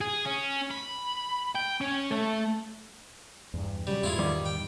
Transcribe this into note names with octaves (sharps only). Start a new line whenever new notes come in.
G#4
C#4
B5
G5
C#4
A3
E2 G2
C#3 F#3 G3
E2 G#2 E4 F4 G#4
D#3 G3
G5